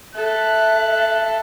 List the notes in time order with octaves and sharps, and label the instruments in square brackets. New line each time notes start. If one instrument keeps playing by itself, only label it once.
[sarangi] A4 [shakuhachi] E5 [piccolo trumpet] F#6